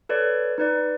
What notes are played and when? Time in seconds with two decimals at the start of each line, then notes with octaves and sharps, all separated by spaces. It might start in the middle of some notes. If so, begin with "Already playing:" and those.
0.09 A4 B4 C#5 D5
0.58 D#4 B4 D5